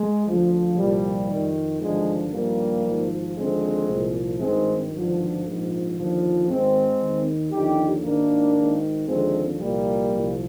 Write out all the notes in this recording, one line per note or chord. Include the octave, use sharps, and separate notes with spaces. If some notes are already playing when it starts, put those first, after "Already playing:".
Already playing: G#3
D2 D3 F3
C2 A#2 F3 G3
F2 D#3
G#1 G2 D3 F3 G#3
G#1 G2 F3 G3 A#3
G#1 G#2 F3
D#2 D3 F3 G#3 C4
C2 A#2 F3
G#1 G2 D#3 G#3 C4
G#1 G2 D3 F3
A#1 G#2 F3
D#2 D3 F3
G#1 G#2 D#3 G#3 C4
D#2 D#3
D#2 D3 F3 D#4 G4
G#1 G#2 D#3 A#3 D4
G#1 G#2 D#3
D#2 D3 F3 G#3 C4
C2 A#2 F3 G3 A#3
C2 A#2 F3